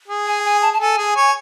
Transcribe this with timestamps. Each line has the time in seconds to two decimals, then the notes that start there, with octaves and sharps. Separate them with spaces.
0.08 G#4
0.27 G#5
0.44 G#5
0.62 A5
0.73 A5
0.80 A4 G#5
0.98 G#4
1.16 C#5